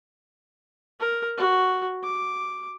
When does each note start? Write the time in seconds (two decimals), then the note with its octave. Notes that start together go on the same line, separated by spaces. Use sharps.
1.00 A#4
1.38 F#4
2.04 D6